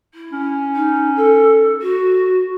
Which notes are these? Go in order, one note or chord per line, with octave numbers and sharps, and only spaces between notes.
E4
C#4
D#4
A4
F#4